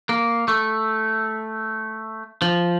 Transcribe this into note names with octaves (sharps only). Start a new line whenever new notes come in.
A#3
A3
F3